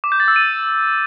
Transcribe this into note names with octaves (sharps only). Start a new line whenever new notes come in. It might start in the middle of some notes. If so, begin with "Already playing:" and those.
D6
G6
A6
E6
D#7